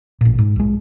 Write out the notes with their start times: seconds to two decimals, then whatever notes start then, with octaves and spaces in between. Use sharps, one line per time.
0.21 A1 A#2
0.38 G#2
0.56 B1 G#3